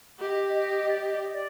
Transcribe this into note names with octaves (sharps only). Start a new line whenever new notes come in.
G4 D#5
D#5
D5
D#5
D5
D#5
D5